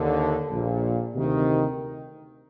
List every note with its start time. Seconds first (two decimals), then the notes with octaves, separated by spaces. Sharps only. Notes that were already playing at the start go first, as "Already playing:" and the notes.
Already playing: D#2 D3
0.51 A#1 A#2
1.14 D2 C3 D#3